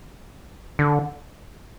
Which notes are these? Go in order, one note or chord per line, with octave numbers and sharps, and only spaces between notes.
D3